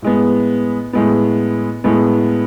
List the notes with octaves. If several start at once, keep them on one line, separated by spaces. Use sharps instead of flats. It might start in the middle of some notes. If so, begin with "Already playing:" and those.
A2 G#3 B3
A2 G#3 B3
A2 G#3 B3